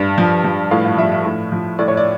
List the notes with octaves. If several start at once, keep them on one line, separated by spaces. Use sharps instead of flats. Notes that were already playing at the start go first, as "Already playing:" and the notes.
Already playing: G2
F3
F3
A2 F5
F5
F3 E5
E5
A2
F3
A2 D5
C#5
D5